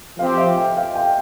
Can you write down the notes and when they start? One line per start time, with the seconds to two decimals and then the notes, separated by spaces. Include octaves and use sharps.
0.19 F3 C4 G4 F5
0.37 E5
0.57 G5
0.77 F5
0.95 G5